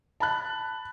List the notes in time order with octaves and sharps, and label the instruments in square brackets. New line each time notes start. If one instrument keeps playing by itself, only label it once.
[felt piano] A5 B5 F#6